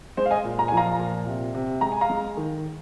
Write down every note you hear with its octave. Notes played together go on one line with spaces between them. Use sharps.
G#3 C5
F5
D#5 G#5
A#2
A#5
F3 G#5
F5 A#5
A#2
C3
C3
G#3 A#5
G#5
F5 A#5
G#3
D#3